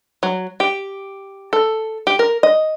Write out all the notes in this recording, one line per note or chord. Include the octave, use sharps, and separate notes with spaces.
F#3
G4
A4
G4
A#4
D#5